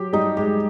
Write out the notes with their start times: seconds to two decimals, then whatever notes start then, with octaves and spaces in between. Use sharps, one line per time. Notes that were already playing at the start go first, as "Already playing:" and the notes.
Already playing: F#3 G4
0.13 G3 D#4
0.37 G#3 G4